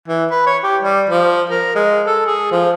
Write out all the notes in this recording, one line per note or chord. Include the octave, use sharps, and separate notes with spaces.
E3
B4
C#5
G4
G3
F3
A#4
G#3
A4
G#4
F3